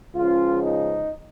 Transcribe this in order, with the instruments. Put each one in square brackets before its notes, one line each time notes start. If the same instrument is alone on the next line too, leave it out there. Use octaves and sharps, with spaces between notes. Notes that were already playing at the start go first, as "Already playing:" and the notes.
[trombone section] C#2 C#3 F3 F4
D#4